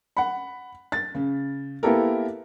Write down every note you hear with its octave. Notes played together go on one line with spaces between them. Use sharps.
F#5 B5
A6
C#3
A#3 B3 E4 G4 A4 A#4